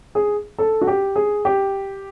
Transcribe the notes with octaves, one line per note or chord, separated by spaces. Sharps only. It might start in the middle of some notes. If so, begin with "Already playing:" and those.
G#4
A4
F#4
G4
G#4
G4